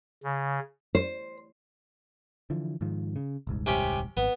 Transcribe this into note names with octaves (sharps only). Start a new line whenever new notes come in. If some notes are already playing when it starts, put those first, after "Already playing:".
C#3
C5
D3 E3 F3
G#2 D#3 F3
C#3
D#1 C2 G#2
C3 C#4 G4
G#1 B3